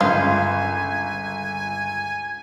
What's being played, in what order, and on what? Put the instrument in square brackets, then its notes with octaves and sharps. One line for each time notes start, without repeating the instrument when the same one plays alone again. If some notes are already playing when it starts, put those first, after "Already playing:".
[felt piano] G1 [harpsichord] C#2 D#3 [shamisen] F4 [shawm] G#5